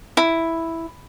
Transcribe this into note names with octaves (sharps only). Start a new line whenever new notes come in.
E4